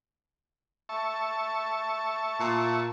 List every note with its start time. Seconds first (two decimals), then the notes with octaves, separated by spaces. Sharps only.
0.89 E5 A5 C#6
2.39 A#2